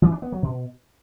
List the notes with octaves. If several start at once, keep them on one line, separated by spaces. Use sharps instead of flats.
E3
D4
B3
F#3
B2